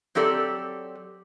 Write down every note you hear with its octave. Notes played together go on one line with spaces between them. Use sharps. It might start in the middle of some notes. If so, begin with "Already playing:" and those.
F#3 C4 G4 A4 D5